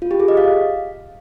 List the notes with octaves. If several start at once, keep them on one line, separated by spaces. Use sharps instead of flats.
F4
G4
G#4
D#5
F5